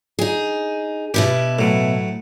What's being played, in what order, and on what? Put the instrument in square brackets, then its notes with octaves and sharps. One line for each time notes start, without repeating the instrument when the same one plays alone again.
[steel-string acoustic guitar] D#4 G#4
[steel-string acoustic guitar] B2 E4 B4 [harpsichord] G4
[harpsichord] A2 F#3